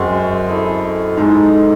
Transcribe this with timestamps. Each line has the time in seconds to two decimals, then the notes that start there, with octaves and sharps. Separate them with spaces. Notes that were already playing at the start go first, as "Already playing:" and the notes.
Already playing: F#2 G#3 C4 F#4
0.47 E4 A4 D#5
1.17 G#2 G#3 D#4 A4